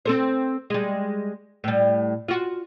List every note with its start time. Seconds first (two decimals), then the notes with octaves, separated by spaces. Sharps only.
0.05 C4 A4 C5
0.70 G3 G#3
1.64 A2 G3
2.28 F4 F#4